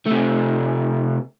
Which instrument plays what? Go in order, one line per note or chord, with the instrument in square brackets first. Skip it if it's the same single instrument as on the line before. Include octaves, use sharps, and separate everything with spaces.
[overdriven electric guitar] C3 A3